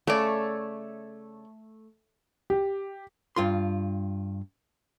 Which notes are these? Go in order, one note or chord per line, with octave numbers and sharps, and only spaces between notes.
C#3 A3 A4 C#5 D5
G4
G2 F4 C6